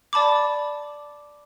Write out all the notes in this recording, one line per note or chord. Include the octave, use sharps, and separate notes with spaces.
D5 A5 B5 D6